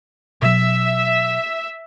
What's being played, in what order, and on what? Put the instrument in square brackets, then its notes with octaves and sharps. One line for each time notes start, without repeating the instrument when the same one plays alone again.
[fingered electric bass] B2 F#3 [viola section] E5